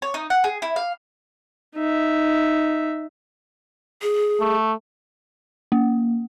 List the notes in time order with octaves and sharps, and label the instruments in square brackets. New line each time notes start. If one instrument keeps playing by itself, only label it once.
[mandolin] C#5
D#4
F#5
G#4
E4
F5
[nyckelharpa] D#4 E5
[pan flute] G#4
[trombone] A3
[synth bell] A#3